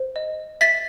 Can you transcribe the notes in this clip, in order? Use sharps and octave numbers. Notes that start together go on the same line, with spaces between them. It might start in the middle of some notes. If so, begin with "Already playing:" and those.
Already playing: C5
D#5
E5 A6 B6